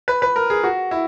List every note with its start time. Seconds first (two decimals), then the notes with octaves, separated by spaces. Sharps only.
0.08 B4
0.22 B4
0.36 A#4
0.50 G#4
0.64 F#4
0.91 E4